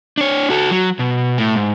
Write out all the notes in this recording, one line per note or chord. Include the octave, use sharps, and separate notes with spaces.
D4 C#5
F#4 A4
F#3
B2
A2
G#2